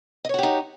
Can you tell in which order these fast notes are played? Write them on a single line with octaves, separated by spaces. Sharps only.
D#5 C#5 F#4 G4 D#4